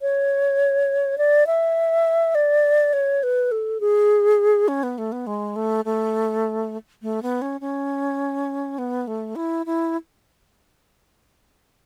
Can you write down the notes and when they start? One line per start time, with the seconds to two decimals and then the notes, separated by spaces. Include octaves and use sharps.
0.02 C#5
1.18 D5
1.47 E5
2.35 D5
2.93 C#5
3.23 B4
3.51 A4
3.80 G#4
4.68 C#4
4.83 B3
4.98 A3
5.12 B3
5.27 G#3
5.56 A3
5.85 A3
7.02 A3
7.23 B3
7.42 C#4
7.61 C#4
8.78 B3
9.07 A3
9.36 E4
9.66 E4